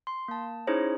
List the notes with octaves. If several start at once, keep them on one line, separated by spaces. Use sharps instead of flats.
C6
A#3 A5
C#4 D#4 E4 G#4 C5 C#5